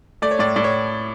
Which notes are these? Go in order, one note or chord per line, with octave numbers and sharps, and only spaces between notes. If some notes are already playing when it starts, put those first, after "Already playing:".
A3 D5
C#5
A2 D5
A2 D5
C#5